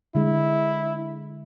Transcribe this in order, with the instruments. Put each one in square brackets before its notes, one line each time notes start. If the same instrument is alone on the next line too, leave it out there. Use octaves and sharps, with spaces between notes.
[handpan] D3 G#3 [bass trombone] E4